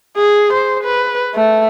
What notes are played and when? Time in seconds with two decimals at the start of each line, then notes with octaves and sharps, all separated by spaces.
0.17 G#4
0.53 C5
0.83 B4
1.35 A3